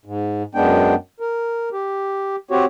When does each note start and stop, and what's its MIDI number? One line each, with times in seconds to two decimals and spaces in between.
0.05 0.43 44
0.55 0.95 42
0.55 0.95 56
0.55 0.95 59
0.55 0.95 62
0.55 0.95 79
1.20 1.69 70
1.73 2.36 67
2.51 2.65 60
2.51 2.65 66
2.51 2.65 67
2.51 2.65 73